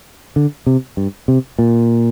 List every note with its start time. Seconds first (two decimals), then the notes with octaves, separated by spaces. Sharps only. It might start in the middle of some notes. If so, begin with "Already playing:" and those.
0.36 D3
0.67 C3
0.97 G2
1.28 C3
1.59 A#2